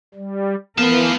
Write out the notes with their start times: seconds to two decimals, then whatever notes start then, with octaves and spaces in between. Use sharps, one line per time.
0.14 G3
0.78 E3 B3 F4 A#4 A5